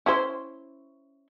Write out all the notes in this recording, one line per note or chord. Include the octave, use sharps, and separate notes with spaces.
C#4 E4 C5